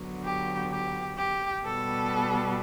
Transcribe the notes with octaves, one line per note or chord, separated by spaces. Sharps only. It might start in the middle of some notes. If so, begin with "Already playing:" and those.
Already playing: D3 F#3 B3
G4
G4
G4
B2 G3 B3 A4